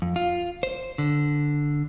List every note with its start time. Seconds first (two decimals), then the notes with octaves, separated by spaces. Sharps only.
0.02 F2
0.16 F4
0.63 C5
0.98 D3